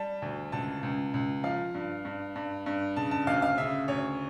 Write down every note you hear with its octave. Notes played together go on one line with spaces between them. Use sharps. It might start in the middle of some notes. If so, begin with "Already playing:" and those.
Already playing: G3 A5
D2
C#2 A5
C#2
C#2
F3 F5
G2
G2
G2
G2
C#3 A5
A5
D2 F5
F5
C#3 E5
D2 C#5